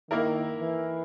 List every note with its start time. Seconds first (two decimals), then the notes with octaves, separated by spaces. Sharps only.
0.11 D#3 A#3 E4 A#4
0.60 E3